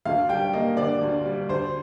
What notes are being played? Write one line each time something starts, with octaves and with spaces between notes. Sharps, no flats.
D2 F5
G3 G5
A#3 D#5
D3 D5
D2
G3
D2 C5